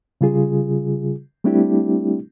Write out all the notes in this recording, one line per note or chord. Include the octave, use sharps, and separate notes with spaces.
C#3 G3 F4 G#4
G3 A3 C4 D4 E4 G4